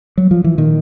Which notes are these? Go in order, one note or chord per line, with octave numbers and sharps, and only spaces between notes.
F#3
F3
E3
A#2 D#3